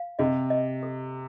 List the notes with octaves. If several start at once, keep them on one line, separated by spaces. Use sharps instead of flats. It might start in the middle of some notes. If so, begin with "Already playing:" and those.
Already playing: F5
C3 D#5
D#5
A4